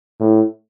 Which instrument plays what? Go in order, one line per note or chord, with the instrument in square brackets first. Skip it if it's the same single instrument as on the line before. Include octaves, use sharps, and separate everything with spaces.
[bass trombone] A2